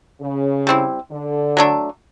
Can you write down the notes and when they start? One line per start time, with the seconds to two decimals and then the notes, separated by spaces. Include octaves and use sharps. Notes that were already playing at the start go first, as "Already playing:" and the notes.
0.21 C#3
0.67 G3 C4 E4
1.11 D3
1.57 F#3 A3 D4